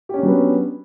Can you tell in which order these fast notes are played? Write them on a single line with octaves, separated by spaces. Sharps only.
G4 C#4 D4 F#3 B3